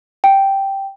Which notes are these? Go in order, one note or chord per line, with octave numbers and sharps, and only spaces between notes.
G5